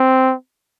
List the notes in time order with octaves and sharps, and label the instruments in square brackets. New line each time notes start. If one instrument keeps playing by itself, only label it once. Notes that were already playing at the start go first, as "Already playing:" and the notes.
Already playing: [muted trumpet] C4